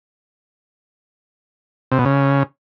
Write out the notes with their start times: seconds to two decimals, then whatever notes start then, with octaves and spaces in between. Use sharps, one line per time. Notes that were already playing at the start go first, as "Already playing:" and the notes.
1.92 C3
1.98 B2
2.05 C#3